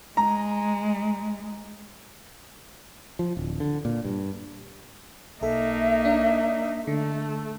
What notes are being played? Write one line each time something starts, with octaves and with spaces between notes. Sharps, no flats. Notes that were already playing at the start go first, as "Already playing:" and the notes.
G#3 A#5
F3
D1
D3
A#2
G2
B1 A#3 D#4 A4 E5
D4
D3 A3